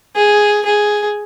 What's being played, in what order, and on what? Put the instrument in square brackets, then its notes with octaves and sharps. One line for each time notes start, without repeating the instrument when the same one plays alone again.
[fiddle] G#4
G#4